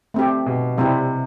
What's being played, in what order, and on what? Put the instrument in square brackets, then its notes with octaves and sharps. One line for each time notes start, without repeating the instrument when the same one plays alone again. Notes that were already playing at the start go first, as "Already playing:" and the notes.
[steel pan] A3 C4 G4
[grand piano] B2
[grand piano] C3 [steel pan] G3 C4 E4